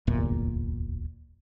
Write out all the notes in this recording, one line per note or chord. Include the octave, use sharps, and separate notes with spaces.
D1 G1 E2 A#2